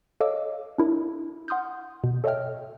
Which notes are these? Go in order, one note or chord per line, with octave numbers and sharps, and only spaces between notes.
A4 C#5 D#5 F5 D6 E6
D4 E4 A#4
F#5 C6 D#6 F6 G6
B2
A4 C#5 D#5 E5 G5 F6